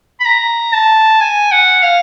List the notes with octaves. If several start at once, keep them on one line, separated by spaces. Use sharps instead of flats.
B5
A#5
A5
G#5
F#5
F5